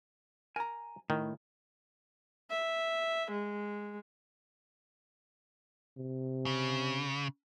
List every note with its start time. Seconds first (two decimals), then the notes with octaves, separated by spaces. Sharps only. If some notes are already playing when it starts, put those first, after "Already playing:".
0.56 A#4 G#5 A#5
1.10 A2 D#3
2.51 E5
3.31 G#3
5.97 C3
6.46 C#3